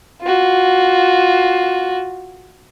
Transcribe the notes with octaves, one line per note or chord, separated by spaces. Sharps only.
F4 F#4